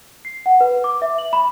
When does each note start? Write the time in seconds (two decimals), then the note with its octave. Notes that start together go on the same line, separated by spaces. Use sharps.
0.25 C7
0.46 F#5
0.61 B4
0.84 D6
1.02 E5
1.18 F#7
1.33 B5